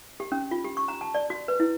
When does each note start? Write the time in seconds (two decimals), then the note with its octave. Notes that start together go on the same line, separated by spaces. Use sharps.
0.20 G4
0.32 C#4
0.51 F4
0.64 G4
0.77 C#6
0.88 A#5
1.01 A5
1.15 D5
1.30 F#4
1.48 B4
1.60 E4